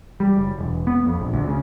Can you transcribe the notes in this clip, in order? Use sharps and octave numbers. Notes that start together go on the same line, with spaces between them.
G3
F#1
E1
B3
F2
A#1
D2
C#3